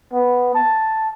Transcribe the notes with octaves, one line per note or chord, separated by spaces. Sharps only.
B3
A5